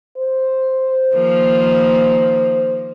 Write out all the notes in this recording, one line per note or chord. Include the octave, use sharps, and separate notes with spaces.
C5
D#3 F3 A#3